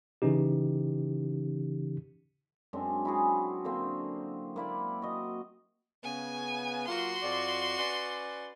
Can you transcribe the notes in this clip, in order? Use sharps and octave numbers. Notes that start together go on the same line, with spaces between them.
C#3 E3 C#4 D#4 G4
F#2 G#3 C4 D4
E4 F#4 G#4
D3 A#3 C4
A#3 E4 D5
F#4 D#5
C#3 B3 G#5
F#3 A#3 F4 F#4 C6
F2 D5
C#4 B4 D5